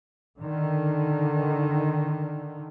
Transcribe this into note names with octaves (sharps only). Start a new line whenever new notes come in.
D3 D#3